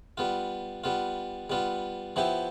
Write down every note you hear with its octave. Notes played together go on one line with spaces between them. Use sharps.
G3 B3 F4
G3 B3 F4
G3 B3 F4
F3 B3 E4 G4